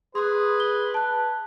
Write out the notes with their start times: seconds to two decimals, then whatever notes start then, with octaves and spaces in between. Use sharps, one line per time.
0.15 G#4 B4 C6 D#6
0.60 G7
0.94 A5 F#6